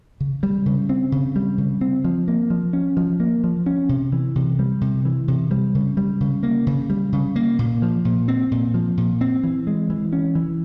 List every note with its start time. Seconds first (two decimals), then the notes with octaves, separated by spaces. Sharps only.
0.20 C#3
0.43 G3
0.66 C#3
0.89 C4
1.12 C#3
1.36 G3
1.58 C#3
1.81 C4
2.05 F3
2.28 A#3
2.50 F3
2.73 C#4
2.97 F3
3.20 A#3
3.44 F3
3.66 C#4
3.89 C3
4.12 E3
4.36 C3
4.59 G3
4.81 C3
5.05 E3
5.28 C3
5.51 G3
5.75 C#3
5.97 G3
6.21 C#3
6.43 A#3
6.67 C#3
6.90 G3
7.13 C#3
7.36 A#3
7.59 A#2
7.82 F3
8.05 A#2
8.28 C4
8.52 A#2
8.74 F3
8.97 A#2
9.21 C4
9.44 E3
9.67 G#3
9.90 E3
10.13 C#4
10.35 E3